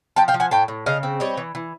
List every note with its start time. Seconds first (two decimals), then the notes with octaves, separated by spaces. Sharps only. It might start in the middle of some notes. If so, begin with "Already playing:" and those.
0.16 F3 G5 A5
0.28 F5 G5
0.34 F3
0.40 F#5 G#5
0.51 A2 G5 A5
0.68 A2
0.86 C#3 D#5 F5
1.03 C4
1.20 G3 C#5 D#5
1.37 E3
1.55 E3